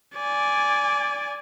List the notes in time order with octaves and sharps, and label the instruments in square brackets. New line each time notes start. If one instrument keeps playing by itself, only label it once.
[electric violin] D5 G#5